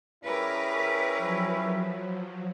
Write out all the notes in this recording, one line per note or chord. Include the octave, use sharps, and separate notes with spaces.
G3 C#4 E4 G#4 A#4 B4 D6
F3 F#3